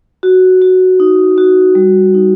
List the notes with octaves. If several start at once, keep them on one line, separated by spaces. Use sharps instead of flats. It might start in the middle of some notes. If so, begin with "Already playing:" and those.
F#4
F#4
D#4
F#4
G3
D#4